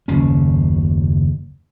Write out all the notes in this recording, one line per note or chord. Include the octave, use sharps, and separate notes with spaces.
F#1 D#2 C#3 C#4